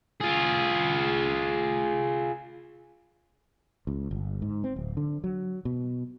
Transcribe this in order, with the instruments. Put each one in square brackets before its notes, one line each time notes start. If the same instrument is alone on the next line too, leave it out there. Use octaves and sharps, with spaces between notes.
[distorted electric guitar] F4 G#4
[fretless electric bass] C#2
G1
G#2
C4
D1
D3
F#3
B2